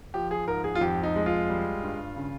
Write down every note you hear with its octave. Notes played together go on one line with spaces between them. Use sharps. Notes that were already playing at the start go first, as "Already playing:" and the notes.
F3 G4
G#4
G#2 A#4
G#4
F4
F2 G4
D#4
G#3
F4
G3
G2
C#3